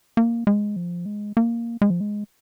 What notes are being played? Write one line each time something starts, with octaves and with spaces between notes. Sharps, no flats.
A#3
G#3
F3
G#3
A#3
G#3
F3
G#3